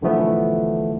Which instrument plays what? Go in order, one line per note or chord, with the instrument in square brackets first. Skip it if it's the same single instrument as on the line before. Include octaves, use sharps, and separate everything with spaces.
[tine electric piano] B1 D3 E3 F3 A3 B3